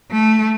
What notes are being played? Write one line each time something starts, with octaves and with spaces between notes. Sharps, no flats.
A3